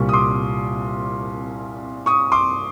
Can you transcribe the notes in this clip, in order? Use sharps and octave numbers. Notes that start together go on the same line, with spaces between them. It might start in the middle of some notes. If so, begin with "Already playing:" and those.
Already playing: C2 A#2 G3 C#6
D#6
C6 D6
C#6 D#6
C6 D6